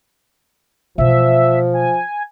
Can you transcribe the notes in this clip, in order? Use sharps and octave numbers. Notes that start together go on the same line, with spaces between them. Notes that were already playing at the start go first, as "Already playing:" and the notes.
B2 E3 F3 E5
G#5